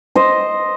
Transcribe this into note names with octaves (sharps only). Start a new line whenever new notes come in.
C5 D#5